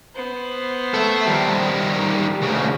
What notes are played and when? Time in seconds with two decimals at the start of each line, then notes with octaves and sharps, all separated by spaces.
0.16 B3 C5
0.94 A4 E5
1.26 D#3 G3
2.42 D2 C#3